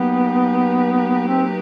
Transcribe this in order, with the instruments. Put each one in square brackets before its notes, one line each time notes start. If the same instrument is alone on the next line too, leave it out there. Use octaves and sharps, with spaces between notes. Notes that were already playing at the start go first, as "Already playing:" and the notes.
Already playing: [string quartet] F#3 A#3 D#4 G4 B4 [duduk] B3
[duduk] C4